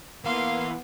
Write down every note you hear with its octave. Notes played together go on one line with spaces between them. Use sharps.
E3 A#3 B3 F5 C6